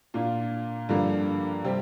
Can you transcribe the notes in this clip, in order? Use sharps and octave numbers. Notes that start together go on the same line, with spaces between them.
A#2 A#3 D4 F4
G2 D3 F3 A#3 D4
C3 G3 C4